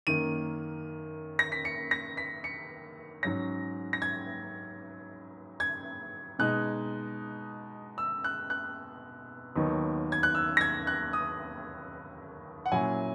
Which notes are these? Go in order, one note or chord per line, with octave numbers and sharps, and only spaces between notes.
F#2 D#3 A#3 D#7
A#6
B6
C#7
A#6
B6
C#7
G#2 F#3 C#4 A#6
A#6
G#6
G#6
B2 G#3 D#4 F#6
E6
F#6
F#6
D#2 D#3 F#3 B3 D#4
G#6
F#6
E6
A#6
G#6
F#6
D#6
F#5
A#2 F#3 C#4 E4 G#5